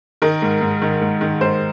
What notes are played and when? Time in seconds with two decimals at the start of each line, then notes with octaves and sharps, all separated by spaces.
0.22 D#3 A#4
0.42 G#2
0.61 G#2
0.82 D#3
1.01 G#2
1.21 D#3
1.41 G#2 C5